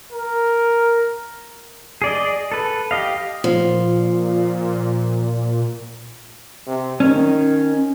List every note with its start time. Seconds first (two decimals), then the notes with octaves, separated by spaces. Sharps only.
0.12 A#4
2.02 G#4 D5 D#5
2.52 A4 B4
2.91 G4 D#5 F5
3.44 A#2 F3
6.67 C3
7.00 D#3 C#4